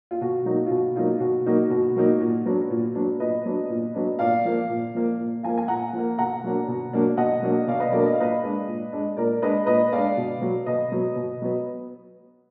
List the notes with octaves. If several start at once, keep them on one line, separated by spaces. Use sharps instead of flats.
F4
B2 F#4
F#3 A#3 D#4
F4
B2 F#4
F#3 A#3 D#4 F4
B2 F#4
F#3 A#3 D#4 F#4
B2 F#4
F#3 A#3 D#4
A#2
F#3 B3 D4
A#2
F#3 B3 D4
A#2 B4 D#5
F#3 B3 D4
A#2
F#3 B3 D4
A#2 D5 F5
F3 A#3
A#2
F3 A#3
A#2
F3 A#3 F5 G#5
G#5
A#2 F#5 A#5
F3 A#3
B2 F#5 A#5
F#3 A#3 D4
B2
F#3 A#3 D4
B2 D#5 F#5
F#3 A#3 D4
B2 D5 F5
B4 D#5
F#3 A#3 D4 A#4 D5
D#5
F5
A#2 B4 D#5
G#3 D4
A#2
G#3 D4
A#2 A#4 D5
G#3 D4 B4 D#5
A#2 B4 D#5
G#3 D4 D5 F5
B2
F#3 B3
B2 B4 D#5
F#3 B3
B2
F#3 B3